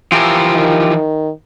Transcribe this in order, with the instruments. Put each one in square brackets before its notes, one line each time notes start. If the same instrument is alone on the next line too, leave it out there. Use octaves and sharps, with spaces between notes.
[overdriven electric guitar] E3 F3 [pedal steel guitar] F4 G4 A#4
[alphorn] D#3